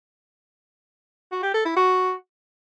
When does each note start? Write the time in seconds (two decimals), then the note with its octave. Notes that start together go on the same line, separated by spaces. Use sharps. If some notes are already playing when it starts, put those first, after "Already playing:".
1.32 F#4
1.43 G4
1.54 A4
1.65 E4
1.76 F#4